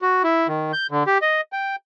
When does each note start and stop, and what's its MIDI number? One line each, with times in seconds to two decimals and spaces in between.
0.02 0.23 66
0.24 0.47 64
0.48 0.72 51
0.73 0.87 91
0.91 1.03 50
1.07 1.18 67
1.22 1.41 75
1.53 1.76 79